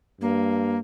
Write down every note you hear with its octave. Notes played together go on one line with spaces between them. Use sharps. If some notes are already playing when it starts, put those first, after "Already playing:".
G2 A#3